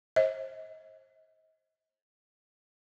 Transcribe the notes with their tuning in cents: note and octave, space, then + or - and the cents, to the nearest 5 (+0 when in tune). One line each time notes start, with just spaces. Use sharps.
C5 +40 D#5 +35